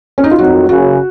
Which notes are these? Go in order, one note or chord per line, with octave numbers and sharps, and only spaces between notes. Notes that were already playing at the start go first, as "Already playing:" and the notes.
C#4
D#4
F4
F2 D#3 F#3 F#4
F#1 F#2 C#3 F#4